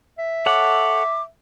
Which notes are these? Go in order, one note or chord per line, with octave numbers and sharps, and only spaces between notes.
E5
A4 C#5 F#5 D6